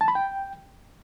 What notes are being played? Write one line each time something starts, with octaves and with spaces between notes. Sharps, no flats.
A5
B5
G5